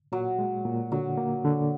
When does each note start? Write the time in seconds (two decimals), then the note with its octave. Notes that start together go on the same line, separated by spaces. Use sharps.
0.12 A#2 F#3
0.39 G#3
0.65 A#2
0.92 D3 F#3
1.18 A#3
1.44 D3